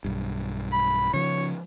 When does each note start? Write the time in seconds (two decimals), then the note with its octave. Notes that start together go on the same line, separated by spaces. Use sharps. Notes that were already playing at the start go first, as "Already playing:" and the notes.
0.05 B1 G2
0.72 B5
1.14 C#3 F3 C#5